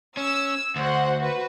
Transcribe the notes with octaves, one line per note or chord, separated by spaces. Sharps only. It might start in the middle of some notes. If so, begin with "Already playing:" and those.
C#4 E6
D2 F#4 C5 F#5
F#4 B4